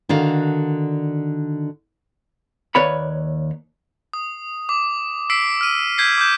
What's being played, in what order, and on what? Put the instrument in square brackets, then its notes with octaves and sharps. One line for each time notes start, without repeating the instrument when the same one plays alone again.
[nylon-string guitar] D3 D#3 D4 F#4 F5
[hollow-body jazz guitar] D#2 B4 C#5 D5 B5
[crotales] D#6
D6
E6 B6 C7 D7
F6 D#7
G6 G#6 B6 C7
D6 G6